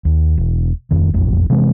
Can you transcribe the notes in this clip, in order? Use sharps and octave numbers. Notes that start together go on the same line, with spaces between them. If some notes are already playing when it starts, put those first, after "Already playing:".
D#2
E1
D#1 C2 F2 D#3
E1 A1 F2
C3 E3 G#3